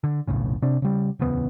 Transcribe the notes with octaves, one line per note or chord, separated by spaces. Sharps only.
D3
F1 B1 A2 C#3
C3 D4
C#3 G3
D1 E2 C#3 B3